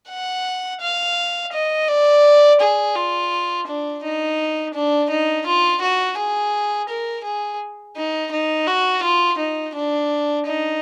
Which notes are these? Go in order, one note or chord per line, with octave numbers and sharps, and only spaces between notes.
F#5
F5
D#5
D5
G#4
F4
D4
D#4
D4
D#4
F4
F#4
G#4
A#4
G#4
D#4
D#4
F#4
F4
D#4
D4
D#4